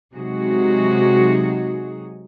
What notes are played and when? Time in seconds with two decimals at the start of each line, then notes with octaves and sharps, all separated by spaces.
0.13 C3 F#3 G#3 D#4 F#4 G#4